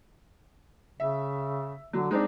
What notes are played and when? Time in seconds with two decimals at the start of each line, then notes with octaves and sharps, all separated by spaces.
1.00 C#3 E5
1.93 D3 F#3
2.11 G#3 C4 D4 D#4